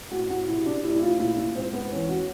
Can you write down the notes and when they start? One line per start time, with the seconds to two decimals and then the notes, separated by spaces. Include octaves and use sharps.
0.12 A2 F#4
0.30 A2 F#4
0.48 C3 E4
0.66 C3 D4
0.84 A2 E4
0.95 E4
1.01 A2 F4
1.19 A#2 E4
1.38 A#2
1.55 G#2 C4
1.73 G#2 B3
1.91 E2 C#4
2.09 F#4